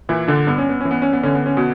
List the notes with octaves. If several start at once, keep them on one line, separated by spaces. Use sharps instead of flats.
A#2 E3 E4
D3 D4
G2 B3
C#4
B3
E3 C#4
B3
C#4
B3
D3 C#4
B3
C#4
B2 B3